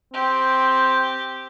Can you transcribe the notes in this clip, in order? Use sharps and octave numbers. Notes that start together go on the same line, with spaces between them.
C4 G4